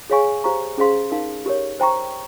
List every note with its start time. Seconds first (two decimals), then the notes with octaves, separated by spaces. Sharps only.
0.10 G#4 C#5 F5 G#5 C#6
0.44 G4 C5 F5 A#5 C#6
0.78 C#4 G#4 C5 F5 C6
1.11 D#4 A#4 F5
1.46 G4 A#4 C#5
1.80 C5 G5 A#5 C#6